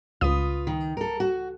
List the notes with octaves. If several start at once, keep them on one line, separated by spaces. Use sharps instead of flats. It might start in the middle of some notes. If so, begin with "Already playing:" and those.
C#2 F4 B4 D#6
D#3
A4 A#4
F#4